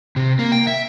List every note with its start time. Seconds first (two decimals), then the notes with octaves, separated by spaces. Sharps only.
0.16 C3
0.39 A#3
0.52 G5
0.67 E5